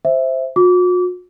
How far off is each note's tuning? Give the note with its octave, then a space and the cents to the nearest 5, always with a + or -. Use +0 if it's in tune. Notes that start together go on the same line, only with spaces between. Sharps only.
C5 +0 E5 +0
F#4 -45 D6 -30